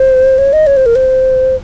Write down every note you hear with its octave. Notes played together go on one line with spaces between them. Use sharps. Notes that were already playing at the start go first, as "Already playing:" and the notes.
Already playing: C5
C#5
D#5
C#5
C5
A#4
C5